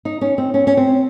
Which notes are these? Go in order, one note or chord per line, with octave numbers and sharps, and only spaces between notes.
D#4
C#4
C4
C#4
C#4
C4